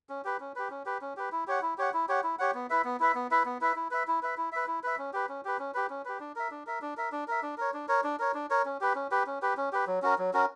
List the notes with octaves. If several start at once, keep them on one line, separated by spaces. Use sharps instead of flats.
C#4
G4 B4
C#4
G4 B4
C#4
G4 B4
C#4
G4 B4
E4
G4 C#5 F#5
E4
G4 C#5 F#5
E4
G4 C#5 F#5
E4
G4 C#5 F#5
B3
E4 B4 E5
B3
E4 B4 E5
B3
E4 B4 E5
B3
E4 B4 E5
E4
B4 E5
E4
B4 E5
E4
B4 E5
E4
B4 E5
C#4
G4 B4
C#4
G4 B4
C#4
G4 B4
C#4
G4 B4
D4
A#4 E5
D4
A#4 E5
D4
A#4 E5
D4
A#4 E5
D4
A#4 C#5
D4
A#4 C#5
D4
A#4 C#5
D4
A#4 C#5
C#4
G4 B4
C#4
G4 B4
C#4
G4 B4
C#4
G4 B4
F#3
C#4 F#4 A#4
F#3
C#4 F#4 A#4